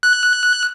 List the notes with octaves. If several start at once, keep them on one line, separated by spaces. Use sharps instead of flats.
F#6